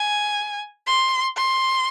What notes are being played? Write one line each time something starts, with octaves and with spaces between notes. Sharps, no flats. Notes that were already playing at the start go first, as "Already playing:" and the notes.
Already playing: G#5
C6
C6